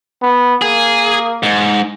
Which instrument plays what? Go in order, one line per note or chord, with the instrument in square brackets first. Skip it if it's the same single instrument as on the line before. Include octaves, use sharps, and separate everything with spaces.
[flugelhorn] B3
[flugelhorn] A#3 [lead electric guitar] G#4
[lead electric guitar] G#2